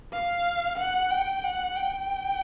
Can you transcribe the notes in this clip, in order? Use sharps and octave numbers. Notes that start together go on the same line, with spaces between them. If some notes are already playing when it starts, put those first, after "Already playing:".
F5
F#5
G5
F#5
G5